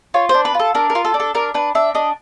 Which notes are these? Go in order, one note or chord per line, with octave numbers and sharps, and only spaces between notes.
F4 C#5
C5
D4
B4
F4 A4
D4 A#4
A#4
F4
A4
D4
A4
D4 A#4
D4 B4
D4 E5
D4 D#5